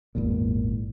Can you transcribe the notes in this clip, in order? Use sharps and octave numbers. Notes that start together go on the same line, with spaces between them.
G#1 E2 A#2